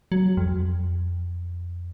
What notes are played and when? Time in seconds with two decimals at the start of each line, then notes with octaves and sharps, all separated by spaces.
0.12 F#3
0.37 F2